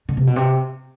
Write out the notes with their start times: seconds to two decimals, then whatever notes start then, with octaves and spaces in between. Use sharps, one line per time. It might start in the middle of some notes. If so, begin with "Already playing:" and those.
0.09 D3
0.17 C3
0.27 B2
0.36 C3